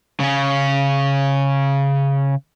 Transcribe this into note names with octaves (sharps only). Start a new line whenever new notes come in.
C#3 C#4